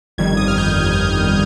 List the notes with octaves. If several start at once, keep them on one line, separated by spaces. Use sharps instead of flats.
G1 F2 D#3 G3 G#6
D#6
F6
G6
G#6